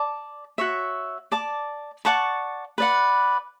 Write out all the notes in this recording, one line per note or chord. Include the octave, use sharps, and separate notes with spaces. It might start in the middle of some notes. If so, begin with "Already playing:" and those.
Already playing: D5 A5 D6
F#4 C#5 E5
D5 A5 D6
D5 F#5 A5 C#6
B4 D5 F#5